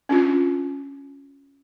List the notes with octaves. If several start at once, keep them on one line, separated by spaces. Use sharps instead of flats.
C#4 D4 F4